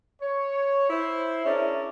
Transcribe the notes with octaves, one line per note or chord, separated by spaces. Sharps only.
C#5
E4 C5
C#4 D4 E4 G#4 A#4 D5